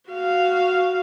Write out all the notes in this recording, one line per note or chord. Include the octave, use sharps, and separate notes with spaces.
F#4 F5